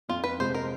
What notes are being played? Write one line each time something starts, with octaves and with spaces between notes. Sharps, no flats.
F2 F4
B4
C3 F3 G#3 C5
A#4